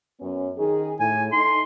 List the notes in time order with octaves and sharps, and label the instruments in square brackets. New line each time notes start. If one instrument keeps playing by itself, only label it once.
[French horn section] F#2 B3 C#4
D#3 D#4 G#4
[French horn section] A2 [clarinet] G#5
[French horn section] A3 D#4 [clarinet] C6